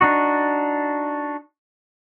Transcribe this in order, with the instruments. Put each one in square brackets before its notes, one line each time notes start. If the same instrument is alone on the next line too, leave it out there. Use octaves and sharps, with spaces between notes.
[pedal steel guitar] D4 D#4 F#4